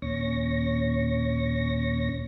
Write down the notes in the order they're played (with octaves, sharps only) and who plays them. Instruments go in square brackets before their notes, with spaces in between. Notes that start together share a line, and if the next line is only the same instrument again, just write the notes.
[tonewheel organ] D#2 A#2 C#4 C#6 A#6